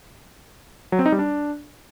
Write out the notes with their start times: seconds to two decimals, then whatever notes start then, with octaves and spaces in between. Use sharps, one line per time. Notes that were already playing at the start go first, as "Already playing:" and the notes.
0.92 F#3
0.99 C4
1.06 D#4
1.12 G3
1.19 D4